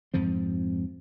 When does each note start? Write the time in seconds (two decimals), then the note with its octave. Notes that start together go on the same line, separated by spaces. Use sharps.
0.14 F2 G#2 F3 C4